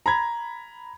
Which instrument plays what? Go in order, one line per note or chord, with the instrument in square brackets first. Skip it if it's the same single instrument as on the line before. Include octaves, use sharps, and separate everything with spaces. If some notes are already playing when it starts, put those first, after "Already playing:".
[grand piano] A#5 B5 G#6